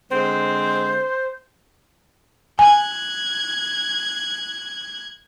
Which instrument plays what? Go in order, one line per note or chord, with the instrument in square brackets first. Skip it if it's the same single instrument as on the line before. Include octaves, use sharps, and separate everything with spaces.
[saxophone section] D3 G#3 C4 [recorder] C5
[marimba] G#5 [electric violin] F#6 G#6